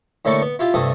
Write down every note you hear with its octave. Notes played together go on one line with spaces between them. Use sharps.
A2 D3 A3 A#3 B5 C#6
B3
E4 F4 G4
G2 C3 A3 D#6